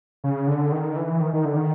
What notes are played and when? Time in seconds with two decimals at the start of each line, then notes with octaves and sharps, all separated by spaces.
0.24 C#3
0.47 D3
0.72 D#3
0.96 E3
1.21 D#3
1.33 D#3
1.45 D3
1.56 D#3